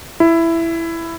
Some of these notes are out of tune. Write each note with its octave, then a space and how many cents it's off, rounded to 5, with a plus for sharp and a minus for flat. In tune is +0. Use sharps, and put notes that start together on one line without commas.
E4 +10